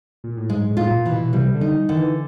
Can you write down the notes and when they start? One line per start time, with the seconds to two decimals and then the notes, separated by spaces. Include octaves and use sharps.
0.24 A#2
0.37 A2
0.49 G#2 G#3
0.70 A2
0.77 F4
0.91 A#2
1.06 E3
1.12 B2
1.33 C3 G3
1.54 D3
1.61 D#4
1.89 D3 D#3
1.96 E3